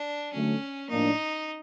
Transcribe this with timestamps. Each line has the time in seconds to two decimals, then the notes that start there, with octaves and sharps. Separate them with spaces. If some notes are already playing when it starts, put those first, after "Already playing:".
Already playing: D4
0.33 D3 F#3 A3 C#4
0.90 A2 F3 A#3 D4 D#4